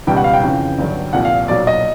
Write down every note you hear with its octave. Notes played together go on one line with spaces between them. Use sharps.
C#2 B2 G3 G5
F#5
F5
G5
F2 C#3 E3
G1 G2 D3 F#3
C2 A#2 F3 F#5
F5
B1 A#2 F#3 D5
D#5